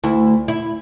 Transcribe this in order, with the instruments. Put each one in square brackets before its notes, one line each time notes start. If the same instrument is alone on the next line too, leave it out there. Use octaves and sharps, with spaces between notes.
[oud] D2 E4
E4